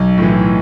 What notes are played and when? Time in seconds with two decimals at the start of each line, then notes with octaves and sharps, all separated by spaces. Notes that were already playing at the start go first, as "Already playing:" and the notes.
Already playing: B1
0.18 A2 E3